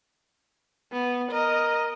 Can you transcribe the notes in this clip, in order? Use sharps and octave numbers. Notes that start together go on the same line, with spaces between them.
B3
A#4 D#5